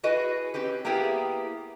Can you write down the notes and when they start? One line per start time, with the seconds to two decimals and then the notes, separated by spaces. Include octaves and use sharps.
0.03 E4 F#4 G#4 B4 D#5
0.54 C4 C#4 G4 B4
0.85 A#3 B3 E4 G4 G#4